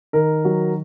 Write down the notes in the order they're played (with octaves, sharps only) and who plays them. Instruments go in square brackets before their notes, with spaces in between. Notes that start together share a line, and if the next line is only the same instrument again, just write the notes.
[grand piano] D#3 A#4
F#3